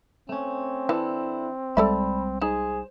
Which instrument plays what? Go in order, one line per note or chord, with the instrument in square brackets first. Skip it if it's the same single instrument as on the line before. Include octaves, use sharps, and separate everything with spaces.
[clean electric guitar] A3 C#4 [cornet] C4
[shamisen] E3 [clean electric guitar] D4 E4 A4
[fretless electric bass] C2 G3 G#3 [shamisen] A4 D5 E5 [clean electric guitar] A5 B5
[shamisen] D#4 [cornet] G#4 [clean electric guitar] C5